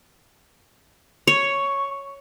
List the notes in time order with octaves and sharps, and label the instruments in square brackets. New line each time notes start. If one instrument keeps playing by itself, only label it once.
[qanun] C#5 [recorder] C#6